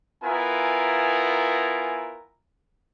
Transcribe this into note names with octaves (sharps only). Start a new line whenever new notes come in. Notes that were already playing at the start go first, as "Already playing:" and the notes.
B3 E4 F4 A#4 G#5